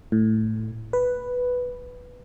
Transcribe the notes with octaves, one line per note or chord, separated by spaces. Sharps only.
A2
B4